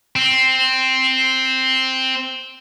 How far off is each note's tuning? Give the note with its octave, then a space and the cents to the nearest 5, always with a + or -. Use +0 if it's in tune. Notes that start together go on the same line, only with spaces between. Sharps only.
C4 +0